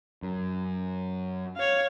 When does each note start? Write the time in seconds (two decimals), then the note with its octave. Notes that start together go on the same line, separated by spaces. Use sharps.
0.23 F#2
1.56 C#5 F5